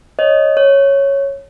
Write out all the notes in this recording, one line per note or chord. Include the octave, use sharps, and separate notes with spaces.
C#5 D#5
C#5